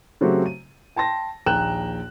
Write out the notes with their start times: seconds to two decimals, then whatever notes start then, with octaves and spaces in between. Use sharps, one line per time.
0.21 C#3 F#3 A3 C4 F#4 G4
0.46 D#7
0.96 G5 A5 C6 A#6
1.46 A#1 D#2 G5 A#5 F#6 E7